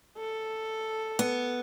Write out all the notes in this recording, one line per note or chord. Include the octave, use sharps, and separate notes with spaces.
A4
B3